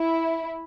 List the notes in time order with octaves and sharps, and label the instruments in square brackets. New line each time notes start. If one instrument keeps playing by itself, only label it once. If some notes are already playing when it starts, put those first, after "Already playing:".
Already playing: [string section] E4